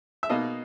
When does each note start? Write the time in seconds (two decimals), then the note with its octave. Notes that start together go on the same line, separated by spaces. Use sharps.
0.23 E5
0.29 B2 A#3 D#4 D#5